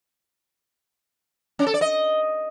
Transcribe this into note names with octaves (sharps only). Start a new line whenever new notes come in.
C#4
A4
D5
D#5